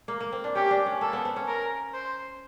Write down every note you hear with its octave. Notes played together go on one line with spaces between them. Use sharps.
A#3
A#3
C4
D4
C#4 G4
D4
C#4
A#3 A4
B3
C4
C#4
A#4
C5